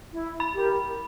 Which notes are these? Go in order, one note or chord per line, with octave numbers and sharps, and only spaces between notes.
E4
B5
G4 A#4